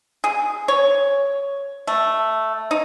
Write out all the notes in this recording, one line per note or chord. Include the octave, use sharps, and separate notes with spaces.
G#4
C#5
A3
D#4